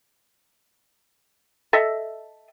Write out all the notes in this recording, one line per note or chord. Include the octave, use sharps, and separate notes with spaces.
A4 D#5 E5